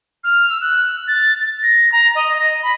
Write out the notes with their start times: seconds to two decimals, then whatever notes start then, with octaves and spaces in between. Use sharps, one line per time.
0.24 F6
0.50 E6
0.61 F#6
1.08 A6
1.63 A#6
1.92 A#5
2.15 D#5
2.36 A#6
2.63 B5